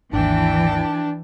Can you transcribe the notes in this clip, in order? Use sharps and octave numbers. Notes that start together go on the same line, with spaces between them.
G#1 D#2 E3 D4 G5 A5